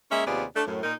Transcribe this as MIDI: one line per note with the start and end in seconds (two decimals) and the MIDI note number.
0.11 0.25 56
0.11 0.25 58
0.11 0.25 61
0.11 0.25 68
0.11 0.25 76
0.26 0.44 39
0.26 0.44 48
0.26 0.44 59
0.26 0.44 65
0.26 0.44 68
0.26 0.44 74
0.55 0.62 57
0.55 0.62 62
0.67 0.82 42
0.67 0.82 45
0.83 0.94 46
0.83 0.94 63
0.83 0.94 70